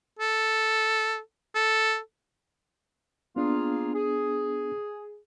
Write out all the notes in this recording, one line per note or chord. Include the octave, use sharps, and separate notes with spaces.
A4
A4
A#3 B3 D4 F4 G#4
G#4